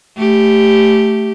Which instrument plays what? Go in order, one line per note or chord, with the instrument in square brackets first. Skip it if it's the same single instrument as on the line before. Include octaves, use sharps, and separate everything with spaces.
[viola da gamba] A3 G4